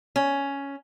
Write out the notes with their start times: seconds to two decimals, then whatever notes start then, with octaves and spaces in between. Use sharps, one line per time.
0.16 C#4